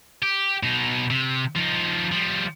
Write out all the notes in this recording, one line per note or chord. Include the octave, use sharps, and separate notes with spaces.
G4
B2 D#4
C3
F3 D#4
F3 G3